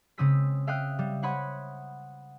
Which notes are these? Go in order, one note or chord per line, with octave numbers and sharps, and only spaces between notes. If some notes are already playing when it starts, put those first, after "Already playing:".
C#3 G#3 C4 D#6 E6 B6
E5 F5 G5 D#6 F#6
G3
C5 C#5 F#5 B5 C6 D#6